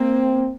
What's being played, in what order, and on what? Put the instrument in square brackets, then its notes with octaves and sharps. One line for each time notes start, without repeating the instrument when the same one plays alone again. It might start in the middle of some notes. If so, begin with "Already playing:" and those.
Already playing: [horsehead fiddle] A#3 [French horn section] C4